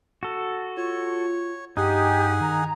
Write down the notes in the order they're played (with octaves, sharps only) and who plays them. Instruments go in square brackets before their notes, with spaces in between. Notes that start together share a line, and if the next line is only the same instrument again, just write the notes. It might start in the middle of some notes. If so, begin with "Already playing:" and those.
[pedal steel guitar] F#4 A4
[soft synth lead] F4 [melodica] C#5
[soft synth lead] G2 [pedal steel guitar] D#4 [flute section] G4 [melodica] G#4 F#5 G#5
[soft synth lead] D#3 [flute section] A#5